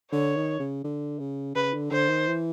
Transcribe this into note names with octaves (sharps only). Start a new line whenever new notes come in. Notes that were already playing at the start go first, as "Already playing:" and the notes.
D3 C#5
D#3
C#3
D3
C#3
C#3 B4
D3
D3 C5
D#3
E3